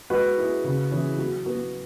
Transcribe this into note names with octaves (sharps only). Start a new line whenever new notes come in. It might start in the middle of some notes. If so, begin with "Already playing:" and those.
G#3 F#4 B4
E4 G#4
C#3
E3 C#4 E4 G#4
F#3
B3 F#4